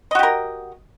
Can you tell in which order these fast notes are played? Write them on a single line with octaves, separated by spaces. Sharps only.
D#5 F#4 G4 A#4